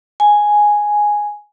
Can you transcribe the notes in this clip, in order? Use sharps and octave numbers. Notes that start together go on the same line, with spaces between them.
G#5